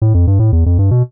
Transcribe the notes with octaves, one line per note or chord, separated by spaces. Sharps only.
A2
F2
G2
A2
E2
F2
G2
B2